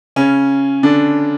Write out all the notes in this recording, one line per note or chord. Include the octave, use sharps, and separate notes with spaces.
C#3 C#4
D3 D4